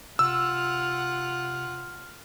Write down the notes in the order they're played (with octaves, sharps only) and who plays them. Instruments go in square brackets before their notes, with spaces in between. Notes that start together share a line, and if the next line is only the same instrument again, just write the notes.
[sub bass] C3 [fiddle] F4 F#5 [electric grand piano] E6 [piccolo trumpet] F6